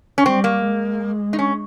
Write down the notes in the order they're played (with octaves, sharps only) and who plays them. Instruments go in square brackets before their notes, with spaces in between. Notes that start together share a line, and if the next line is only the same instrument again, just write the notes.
[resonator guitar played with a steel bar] C#4
[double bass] G3 [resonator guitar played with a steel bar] C4
[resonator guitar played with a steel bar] A#3
[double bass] G#3
[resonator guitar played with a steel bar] D#4
C#4